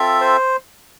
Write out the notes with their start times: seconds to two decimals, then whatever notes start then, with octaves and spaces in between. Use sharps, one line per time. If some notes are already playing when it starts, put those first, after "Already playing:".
Already playing: C4 F4 A4 E5
0.21 C5